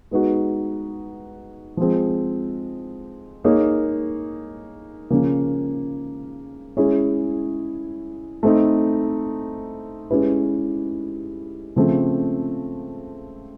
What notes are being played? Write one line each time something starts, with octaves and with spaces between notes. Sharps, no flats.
G#3 B3 D#4 F#4
F3 G#3 C4
A#3 D#4 G#4 C#5
C#3 F3 A#3 C#4
G#3 C#4 E4 G#4 C#5
A3 C4 D#4
G#3 C#4 E4 G4 B4
C#3 F3 A3 C4